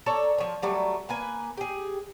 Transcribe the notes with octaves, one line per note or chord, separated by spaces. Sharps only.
A4 C#5 D5 A#5
F3 C#5
F#3 G3 A3
A#3 B4 G#5
G4 G#4